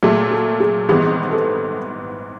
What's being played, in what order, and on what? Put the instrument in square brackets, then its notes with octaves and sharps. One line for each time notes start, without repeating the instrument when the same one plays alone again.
[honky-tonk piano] A#2 F#3 A3 [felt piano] G#4
[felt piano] A4
G#4
[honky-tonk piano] G#1 G#2 E3 G3 B3 [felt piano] G#4
[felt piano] A4